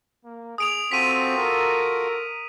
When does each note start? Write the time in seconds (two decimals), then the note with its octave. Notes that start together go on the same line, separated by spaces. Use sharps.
0.24 A#3
0.58 G#4 D#6 D7 F7
0.92 C4 F4 F#4 A4 B6 D#7
1.38 A#4